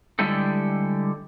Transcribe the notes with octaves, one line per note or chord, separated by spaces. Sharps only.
D3 G3 G#3 E4 G4 A4